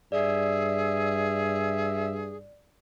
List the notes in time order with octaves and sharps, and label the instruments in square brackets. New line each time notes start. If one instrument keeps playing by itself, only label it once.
[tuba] G2 [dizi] G#4 [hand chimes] D5 [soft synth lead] E5